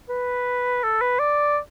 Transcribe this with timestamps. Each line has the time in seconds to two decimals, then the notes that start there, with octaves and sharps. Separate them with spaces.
0.09 B4
0.83 A4
1.01 B4
1.19 D5